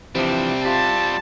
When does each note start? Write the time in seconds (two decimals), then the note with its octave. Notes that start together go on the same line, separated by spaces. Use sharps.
0.15 C3 E3 F3 G3 C4 D4
0.65 F4 G4 A5